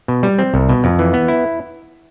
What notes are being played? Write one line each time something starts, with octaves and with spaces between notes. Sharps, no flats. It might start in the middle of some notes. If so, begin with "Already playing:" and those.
B2
G3
C4
C2
B2
F2
E3
B3
E4